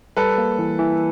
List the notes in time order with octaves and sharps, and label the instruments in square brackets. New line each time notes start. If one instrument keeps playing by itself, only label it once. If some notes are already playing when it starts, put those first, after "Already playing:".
[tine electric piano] G3 [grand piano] A4 B4
[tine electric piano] A#3
E3
E3